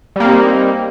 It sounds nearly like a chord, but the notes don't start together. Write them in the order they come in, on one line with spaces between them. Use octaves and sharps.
G3 A#3 C4 D#4